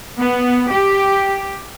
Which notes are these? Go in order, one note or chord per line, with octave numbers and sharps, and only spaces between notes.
B3
G4